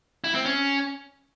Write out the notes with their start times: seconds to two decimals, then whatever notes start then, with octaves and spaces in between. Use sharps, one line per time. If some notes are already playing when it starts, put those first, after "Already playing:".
0.24 E4
0.35 C4
0.45 C#4